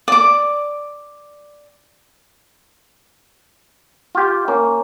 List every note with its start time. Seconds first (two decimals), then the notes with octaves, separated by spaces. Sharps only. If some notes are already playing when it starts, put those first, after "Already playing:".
0.08 D5 D6
4.15 F4 G4
4.48 A#3 C#4